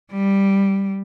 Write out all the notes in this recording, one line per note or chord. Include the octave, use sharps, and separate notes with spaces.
G3